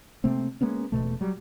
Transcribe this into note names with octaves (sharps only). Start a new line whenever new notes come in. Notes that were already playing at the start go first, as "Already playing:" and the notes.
C3 A3 A#3 C4
G#3 A#3 B3 C#4
E1 B1 B2 A3
F#3 G3